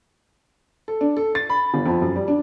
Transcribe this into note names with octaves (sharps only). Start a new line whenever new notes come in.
A4
D4
A4
A6
B5
G1
F2
F#2
G3
D4